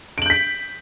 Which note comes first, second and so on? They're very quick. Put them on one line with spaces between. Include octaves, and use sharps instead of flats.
D7 F#7 G6 B6